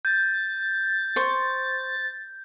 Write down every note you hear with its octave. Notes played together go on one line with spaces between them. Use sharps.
G6 A6
C5 C#6